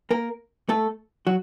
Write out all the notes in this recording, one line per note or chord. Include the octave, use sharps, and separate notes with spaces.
A#3 A#4
A3 A4
F#3 F#4